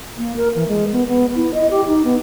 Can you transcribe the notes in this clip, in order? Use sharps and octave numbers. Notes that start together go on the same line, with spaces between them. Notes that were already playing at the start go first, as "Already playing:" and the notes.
A#3
A#4
E3
G#3
B3
B3
E4
D#5
G4
D#4
B3